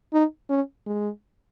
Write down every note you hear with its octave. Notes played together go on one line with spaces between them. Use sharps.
D#4
C#4
G#3